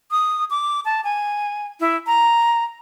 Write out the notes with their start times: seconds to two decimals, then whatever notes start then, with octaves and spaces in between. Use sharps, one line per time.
0.11 D#6
0.50 D6
0.85 A5
1.04 G#5
1.80 E4
2.07 A#5